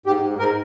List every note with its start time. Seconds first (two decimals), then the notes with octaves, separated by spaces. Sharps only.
0.06 G#2 G4
0.23 G#2
0.38 G#2 A#4